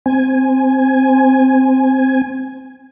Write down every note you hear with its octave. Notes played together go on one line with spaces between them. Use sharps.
C4 G#5